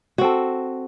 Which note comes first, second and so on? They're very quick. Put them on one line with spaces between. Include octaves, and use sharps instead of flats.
F#4 C4 A4